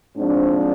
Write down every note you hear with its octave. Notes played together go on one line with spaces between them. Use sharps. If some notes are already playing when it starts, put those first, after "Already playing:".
G#2 F3 C4 D4